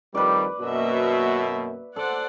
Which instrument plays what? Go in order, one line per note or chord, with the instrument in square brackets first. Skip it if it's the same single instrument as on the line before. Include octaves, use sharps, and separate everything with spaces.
[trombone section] F2 D#3 G3 [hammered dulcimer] B4 D5
[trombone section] F#2 B2 [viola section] A#3 F#4 E5
[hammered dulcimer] A4 [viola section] C5 D5 F#5